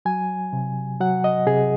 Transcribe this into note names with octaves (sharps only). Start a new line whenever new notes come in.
F#3 G#5
C3
F#3 F#5
D#5
C3 G#4